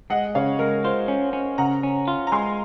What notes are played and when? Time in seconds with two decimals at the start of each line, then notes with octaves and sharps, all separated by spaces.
0.10 G#3 D#5 F#5
0.35 C#3 C#5 F5
0.59 G#3 A#4
0.84 F4 C5
1.08 C#4
1.33 C#4
1.58 C#3 F#5 A#5
1.83 C#4
2.08 F4
2.27 A#5
2.32 G#3 G#5 C6